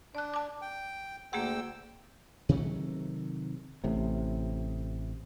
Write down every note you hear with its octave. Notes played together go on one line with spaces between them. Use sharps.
D4 D5 F#6
A5 D6
G5
D2 A#3 G#4 F#5 G5 E6
C3 D#3 F#3 A3
A1 A2 C3